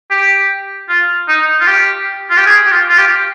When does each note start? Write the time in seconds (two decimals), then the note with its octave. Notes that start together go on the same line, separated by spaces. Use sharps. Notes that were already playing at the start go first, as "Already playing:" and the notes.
0.11 G4
0.89 F4
1.28 D#4
1.60 F4
1.67 G4
2.30 F4
2.37 G4
2.46 G#4
2.66 G4
2.71 F4
2.89 F4
2.98 G4